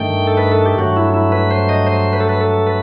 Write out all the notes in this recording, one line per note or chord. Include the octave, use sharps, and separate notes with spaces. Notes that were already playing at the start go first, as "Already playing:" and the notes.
Already playing: G2 D#3 A3 G5
A4
B4
A4
G4
G2 F#3 A3 F#4
E4
E4
B4
C5
D#5
C5
B4
A4
B4
A4
B4